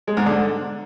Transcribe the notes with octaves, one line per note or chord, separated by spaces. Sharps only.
G#3
G#2
D3